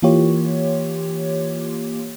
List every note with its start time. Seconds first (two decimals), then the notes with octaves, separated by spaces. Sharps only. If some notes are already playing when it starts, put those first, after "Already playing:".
0.02 E3 A#3 F4 G4 C#5